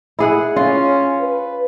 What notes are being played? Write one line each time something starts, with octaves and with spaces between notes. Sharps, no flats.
E4 G#4 F#5
C#4 F4
B4